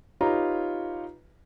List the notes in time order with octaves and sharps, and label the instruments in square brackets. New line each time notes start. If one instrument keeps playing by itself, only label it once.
[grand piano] D#4 F4 G4 B4 C#5 A#5